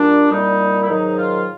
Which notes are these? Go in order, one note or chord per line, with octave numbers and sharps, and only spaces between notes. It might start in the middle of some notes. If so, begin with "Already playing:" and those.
Already playing: A#2 G3 D4
C2 A#2 G3 D#4
E4
G#2 D#3 F#3 D#4
F4